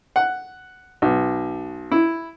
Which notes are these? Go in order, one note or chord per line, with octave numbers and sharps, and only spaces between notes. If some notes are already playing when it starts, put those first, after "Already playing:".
F#5
B1
E4